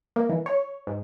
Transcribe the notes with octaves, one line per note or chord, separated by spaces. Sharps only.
A#3
E3
C#5
G#2